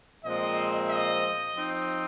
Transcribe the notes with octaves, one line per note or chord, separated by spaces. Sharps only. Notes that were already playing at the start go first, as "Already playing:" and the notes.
A#2 F3 G#3 C4 D#5
D#5
F3 C4 D#4